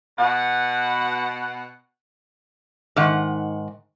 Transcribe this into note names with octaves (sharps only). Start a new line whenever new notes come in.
B2 F#5
G#2 D#3 F#5